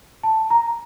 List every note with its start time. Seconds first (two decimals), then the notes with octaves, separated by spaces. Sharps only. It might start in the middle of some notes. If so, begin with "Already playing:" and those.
0.23 A5
0.50 A#5